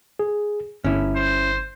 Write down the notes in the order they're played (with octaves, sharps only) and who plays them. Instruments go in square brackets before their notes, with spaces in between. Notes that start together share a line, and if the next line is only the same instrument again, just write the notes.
[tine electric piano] G#4
[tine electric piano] G1 [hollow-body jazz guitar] C#4 E4
[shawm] C5